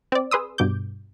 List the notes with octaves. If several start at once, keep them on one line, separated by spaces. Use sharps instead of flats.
C4 D5
G#4 B4 C6 D#6 E6
G2 B2 D6 G6